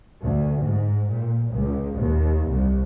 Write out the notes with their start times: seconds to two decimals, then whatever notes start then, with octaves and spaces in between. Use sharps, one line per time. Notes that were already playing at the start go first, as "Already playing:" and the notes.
0.22 D2
0.64 G#2
1.10 A#2
1.51 C#2
1.97 D#2
2.47 C2